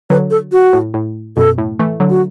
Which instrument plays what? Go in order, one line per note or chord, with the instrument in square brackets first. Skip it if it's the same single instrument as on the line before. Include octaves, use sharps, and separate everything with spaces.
[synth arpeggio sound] D3 F#3 [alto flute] B4
[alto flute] A4
F#4
[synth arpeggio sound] A2
A2
[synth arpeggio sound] F#2 B2 [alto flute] A4
[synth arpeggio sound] A2
E3 A3
D3 F#3
[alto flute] F#4